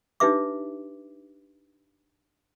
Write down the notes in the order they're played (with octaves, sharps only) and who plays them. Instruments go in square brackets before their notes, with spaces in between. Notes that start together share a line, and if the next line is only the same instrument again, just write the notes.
[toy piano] D4 D#4 G4 B4 E5 D6